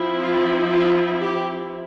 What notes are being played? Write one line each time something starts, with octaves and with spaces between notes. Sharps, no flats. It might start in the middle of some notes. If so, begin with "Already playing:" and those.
Already playing: F3 C4 E4
F4
F4
G4